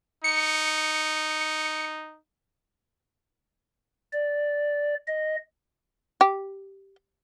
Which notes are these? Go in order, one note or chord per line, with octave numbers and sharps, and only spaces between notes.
D#4 C#7
D5
D#5
G4